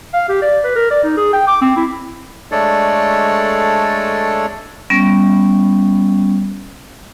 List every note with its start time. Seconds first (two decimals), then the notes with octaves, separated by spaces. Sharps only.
0.14 F5
0.29 G4
0.42 D5
0.64 B4
0.76 A#4
0.91 D5
1.04 D#4
1.17 G#4
1.33 G5
1.47 D6
1.62 C4
1.77 E4
2.51 G#3 A3 D4 A4 C#5 D5
4.90 G3 B3 C#4